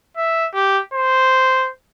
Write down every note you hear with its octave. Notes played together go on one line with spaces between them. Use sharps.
E5
G4
C5